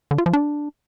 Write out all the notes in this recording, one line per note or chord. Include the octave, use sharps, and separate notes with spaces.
D3
F4
F3
D4